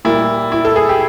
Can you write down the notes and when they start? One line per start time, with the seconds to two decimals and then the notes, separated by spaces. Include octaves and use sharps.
0.05 A#2 G3 A#3 E4
0.52 E4
0.65 A4
0.76 G#4
0.89 G4